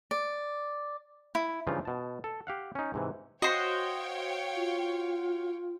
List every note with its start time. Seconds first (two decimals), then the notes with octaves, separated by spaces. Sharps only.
0.11 D5
1.35 E4
1.67 G2 C#3 E3 F3 D#4 F4
1.85 B2 A5
2.24 A4
2.47 G4 F5 F#5
2.75 C#4 D#4
2.94 G#2 C3 E3
3.42 F#4 C5 C#5 D#5 F5 G5
4.55 F4